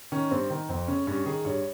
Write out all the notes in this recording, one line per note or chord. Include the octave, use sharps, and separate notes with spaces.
D#3 C#4
G2 C4
D#3
F2 C4
C#3 C#4
G2 C#4
D#3 G#4
G2 C#5